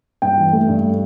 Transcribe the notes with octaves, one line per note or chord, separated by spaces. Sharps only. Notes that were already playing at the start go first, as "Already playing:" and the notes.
G2 G5
E3
A3
G2